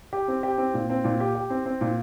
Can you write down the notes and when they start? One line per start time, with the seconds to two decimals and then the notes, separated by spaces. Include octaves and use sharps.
0.13 G4
0.28 C4
0.43 G4
0.58 C4
0.74 A#2
0.90 C4
1.04 A#2
1.20 G4
1.35 G4
1.50 C4
1.66 C4
1.81 A#2